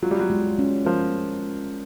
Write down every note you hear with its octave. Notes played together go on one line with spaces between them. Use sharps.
F#3 F4
G3
F#3
G#3
C#4
F3 A#4